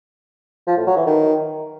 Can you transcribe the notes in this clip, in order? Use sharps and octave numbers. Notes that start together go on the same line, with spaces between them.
F3
A2
F#3
E3
D#3